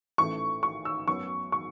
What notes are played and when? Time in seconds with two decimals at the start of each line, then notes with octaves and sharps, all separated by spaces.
0.18 A1 A2 A3 C#6
0.63 C#6
0.85 E6
1.08 F#2 F#3 B3 C#6
1.52 C#6